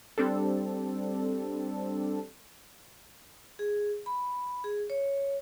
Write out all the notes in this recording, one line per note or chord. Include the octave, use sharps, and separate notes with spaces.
G3 C4 D4 A4
G#4
B5
G#4
C#5